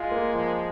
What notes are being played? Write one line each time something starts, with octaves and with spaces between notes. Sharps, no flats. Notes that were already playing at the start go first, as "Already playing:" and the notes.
Already playing: G#3 F4
A#3
F3